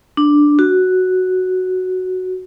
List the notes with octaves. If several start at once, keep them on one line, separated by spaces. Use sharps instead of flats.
D4
F#4